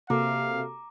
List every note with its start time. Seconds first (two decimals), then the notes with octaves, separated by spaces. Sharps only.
0.10 C3 A#3 F#4 A4 F5 A#5 D6